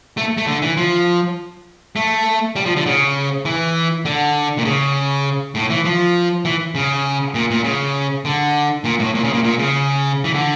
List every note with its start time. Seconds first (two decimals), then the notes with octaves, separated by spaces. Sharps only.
0.17 A3
0.38 A3
0.47 D3
0.62 E3
0.77 F3
1.96 A3
2.56 G3
2.66 F3
2.76 D3
2.86 C#3
3.45 E3
4.05 D3
4.58 A#2
4.65 C#3
5.55 A2
5.70 E3
5.85 F3
6.45 E3
6.75 C#3
7.34 A#2
7.50 A#2
7.64 C#3
8.25 D3
8.84 A#2
8.99 A2
9.15 A#2
9.24 C#3
9.33 A#2
9.44 A#2
9.59 C#3
10.24 E3
10.34 D3